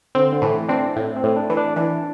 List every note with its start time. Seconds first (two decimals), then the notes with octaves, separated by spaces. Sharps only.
0.15 D3 C4
0.32 D3
0.42 A2 E3
0.68 C4 D4
0.96 A2
1.16 C4
1.23 A2
1.36 D4
1.50 E3
1.57 D4
1.76 E3 D4